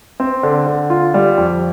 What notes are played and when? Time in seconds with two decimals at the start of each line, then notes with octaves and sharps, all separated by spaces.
0.20 C4
0.43 D3
0.66 D3
0.90 F4
1.14 G3
1.38 F2